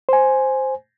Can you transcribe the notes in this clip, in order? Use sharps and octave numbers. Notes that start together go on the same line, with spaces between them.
C5 G#5